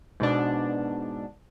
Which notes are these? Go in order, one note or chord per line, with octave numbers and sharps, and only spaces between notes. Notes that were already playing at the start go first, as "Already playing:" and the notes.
G#2 B2 D4